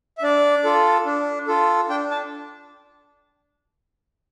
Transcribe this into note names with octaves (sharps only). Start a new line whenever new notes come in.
E5
D4 D5
F4 A4
D4
F4 A4
D4 G5
A5